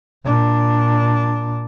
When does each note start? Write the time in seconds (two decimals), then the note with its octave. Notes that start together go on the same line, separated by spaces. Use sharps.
0.24 A#2 D4